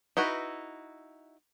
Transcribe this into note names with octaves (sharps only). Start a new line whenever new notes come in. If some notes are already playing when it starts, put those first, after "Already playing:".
D#4 E4 F#4 B4